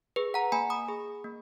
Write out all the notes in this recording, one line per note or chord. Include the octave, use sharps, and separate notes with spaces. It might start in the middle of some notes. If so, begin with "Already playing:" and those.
G#4 B4
F#5 A#5
A#3 G#5 B5
B5 D#6
G#4
A#3